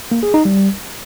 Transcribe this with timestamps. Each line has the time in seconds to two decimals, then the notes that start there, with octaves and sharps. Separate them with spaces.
0.12 A#3
0.23 G#4
0.34 D#4
0.45 G3